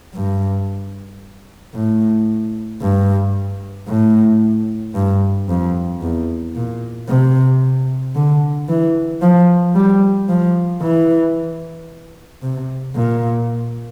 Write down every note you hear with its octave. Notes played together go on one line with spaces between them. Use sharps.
G2
A2
G2
A2
G2
F2
E2
A#2
C3
D3
E3
F3
G3
F3
E3
C3
A#2